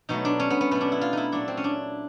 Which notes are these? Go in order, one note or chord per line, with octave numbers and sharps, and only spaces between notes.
B2 F#3 A3 D#4
D4
C#4
B3
B3
B2 F#3 A3 B3
D4
E4
F4
D#4 E4
A#2 F#3 A3 D4
C4
C#4
D4